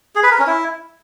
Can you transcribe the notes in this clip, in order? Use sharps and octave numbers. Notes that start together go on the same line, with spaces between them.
G#4
B4
A#4
C#4
E4